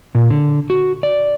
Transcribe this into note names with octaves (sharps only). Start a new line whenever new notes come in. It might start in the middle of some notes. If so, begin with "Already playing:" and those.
A#2
D3
F#4
D5